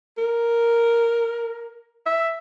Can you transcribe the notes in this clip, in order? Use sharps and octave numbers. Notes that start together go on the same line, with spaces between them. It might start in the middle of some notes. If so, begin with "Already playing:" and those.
A#4
E5